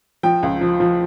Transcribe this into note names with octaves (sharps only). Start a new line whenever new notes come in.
F3 G5
C#2
F3
F3